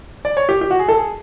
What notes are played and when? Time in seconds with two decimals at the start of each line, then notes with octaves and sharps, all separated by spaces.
0.25 D5
0.37 C#5
0.49 G4
0.61 G4
0.71 F#4
0.79 G#4
0.88 A4
0.98 G#4